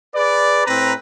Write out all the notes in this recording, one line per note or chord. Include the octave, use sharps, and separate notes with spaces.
G#4 B4 D5
A2 C4 B4 A#5